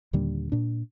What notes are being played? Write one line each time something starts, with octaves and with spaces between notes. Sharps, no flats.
D#2 A#2 D3 G3
A#2 D4